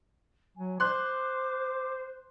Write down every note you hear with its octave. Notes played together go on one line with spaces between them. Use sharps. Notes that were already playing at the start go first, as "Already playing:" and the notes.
F#3 G#5
C5 C6 D6 F#6